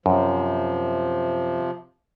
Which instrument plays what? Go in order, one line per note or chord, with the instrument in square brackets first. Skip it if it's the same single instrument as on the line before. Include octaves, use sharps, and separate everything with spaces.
[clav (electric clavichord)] F#2 [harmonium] C3 F3